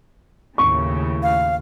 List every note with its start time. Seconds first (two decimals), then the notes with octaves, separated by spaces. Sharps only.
0.58 D#2 A2 C#3 C#6
1.23 F5